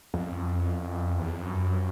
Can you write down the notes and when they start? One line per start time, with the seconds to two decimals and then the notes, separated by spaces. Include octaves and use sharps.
0.14 F2
1.19 E2
1.31 F2
1.42 F#2